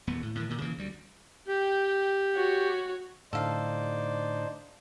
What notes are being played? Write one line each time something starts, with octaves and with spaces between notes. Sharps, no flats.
D#1 E2 B3
A2
A2 D3 D#3
A#2 D#3
C#3 E3 A#3
D2 G3
G4 G5
F#4 C#5
A2 D3 D4 D#4 A4 C5 D5 F5